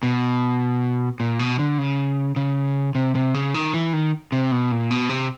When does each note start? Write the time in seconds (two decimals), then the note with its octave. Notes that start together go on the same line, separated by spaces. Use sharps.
0.03 B2
1.20 A#2
1.39 B2
1.59 D3
1.78 C#3
2.36 C#3
2.95 C3
3.15 C3
3.34 C#3
3.54 D#3
3.74 E3
3.93 D#3
4.32 C3
4.52 B2
4.72 A#2
4.91 B2
5.09 C3